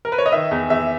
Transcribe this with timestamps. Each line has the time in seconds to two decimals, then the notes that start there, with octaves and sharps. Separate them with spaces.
0.05 A#4
0.12 B4
0.18 C#5
0.26 D#5
0.32 D#3 E5
0.51 E2
0.70 E2 E5